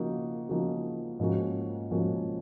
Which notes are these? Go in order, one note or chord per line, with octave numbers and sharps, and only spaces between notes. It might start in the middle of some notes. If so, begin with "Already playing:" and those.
Already playing: C#3 F3 A#3 D#4 F#4
C#3 F3 A#3 D#4 F#4
G#2 F3 A#3 C#4 F#4
G#2 F3 A#3 C#4 F#4